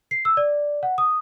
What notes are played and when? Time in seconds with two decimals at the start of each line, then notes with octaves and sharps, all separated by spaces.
0.11 C7
0.25 E6
0.37 D5
0.83 F#5
0.98 D#6